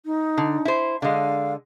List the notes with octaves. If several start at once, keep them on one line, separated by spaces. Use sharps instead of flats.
D#4
D3
E4 C5
D3 G#3 F5